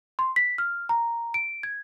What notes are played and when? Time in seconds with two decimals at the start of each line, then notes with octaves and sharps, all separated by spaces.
0.19 C6
0.36 B6
0.58 F6
0.89 A#5
1.34 D7
1.63 G#6